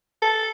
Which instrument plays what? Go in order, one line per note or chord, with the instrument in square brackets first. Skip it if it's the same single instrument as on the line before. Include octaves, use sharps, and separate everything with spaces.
[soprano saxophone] A4